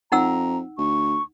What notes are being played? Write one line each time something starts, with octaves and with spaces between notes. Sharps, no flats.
F2 D#4 F#5 A#5 E6
D2 C#6